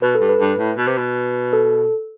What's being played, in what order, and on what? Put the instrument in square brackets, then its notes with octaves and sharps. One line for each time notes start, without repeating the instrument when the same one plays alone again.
[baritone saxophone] B2 [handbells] B4
[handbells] A4
[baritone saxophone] G2
[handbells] B4
[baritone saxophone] G2
A2
B2
C3
B2
[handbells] A4